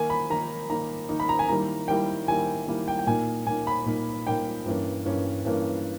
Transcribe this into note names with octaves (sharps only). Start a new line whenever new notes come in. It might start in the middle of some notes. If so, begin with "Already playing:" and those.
Already playing: D#3 A#3 D#4 G#5
B5
D#3 A#3 D#4 A#5
D#3 A#3 D#4 A#5
D#3 A#3 D#4
B5
A#5
G#5
D#3 G3 A#3 E4 A#5
D#3 G3 A#3 E4 G5
D#3 G3 A#3 E4 G#5
D#3 G3 A#3 E4
G5
G5
A#2 A#3 D#4 G#5
A#2 A#3 D#4 G#5
B5
A#2 A#3 D#4
A#2 A#3 D#4 G5
G2 E3 A#3 C#4
G2 E3 A#3 C#4
G2 E3 A#3 C#4